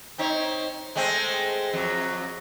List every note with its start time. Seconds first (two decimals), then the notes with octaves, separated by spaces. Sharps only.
0.18 C4 D#4 C#5
0.95 G#3 A3 C4
1.73 F2 F#3